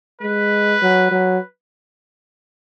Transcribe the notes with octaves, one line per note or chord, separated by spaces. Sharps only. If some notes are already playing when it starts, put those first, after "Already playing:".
G#3 B4
F#3
F#3